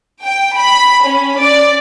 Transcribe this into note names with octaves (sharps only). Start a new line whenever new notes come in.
G5
B5
C#4
D5